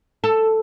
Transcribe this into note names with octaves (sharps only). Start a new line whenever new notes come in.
A4